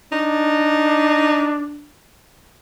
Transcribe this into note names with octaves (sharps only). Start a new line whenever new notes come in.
D4 D#4